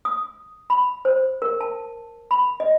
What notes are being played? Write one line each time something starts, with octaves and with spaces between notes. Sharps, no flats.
D#6
B5
C5
A#4
A5
B5
D#5